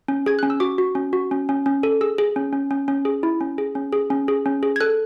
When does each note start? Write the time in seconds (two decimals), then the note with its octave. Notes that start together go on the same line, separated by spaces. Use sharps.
0.08 C#4
0.26 G#4 G#6
0.39 C#4 F#6
0.50 E6
0.60 F#4 D6
0.78 F#4
0.95 C#4
1.13 F#4
1.31 C#4
1.49 C#4
1.66 C#4
1.83 A4
2.01 G#4 E6
2.18 G#4
2.36 C#4
2.53 C#4
2.71 C#4
2.88 C#4
3.05 G#4
3.23 E4
3.41 C#4
3.58 G#4
3.75 C#4
3.92 G#4
4.10 C#4
4.28 G#4
4.46 C#4
4.63 G#4
4.76 G#6
4.80 A4 F#6